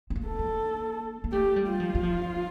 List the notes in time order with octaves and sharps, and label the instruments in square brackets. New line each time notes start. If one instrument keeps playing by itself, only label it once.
[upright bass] C4
A#3
[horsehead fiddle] A4
[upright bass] A#3
A#3
[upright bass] A3 [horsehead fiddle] G4
[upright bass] G3
[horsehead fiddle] F4
[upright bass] F3
G3
F3